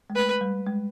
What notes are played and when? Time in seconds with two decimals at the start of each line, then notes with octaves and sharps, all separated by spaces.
0.10 G#3
0.16 A3 B4
0.41 G3
0.66 G#3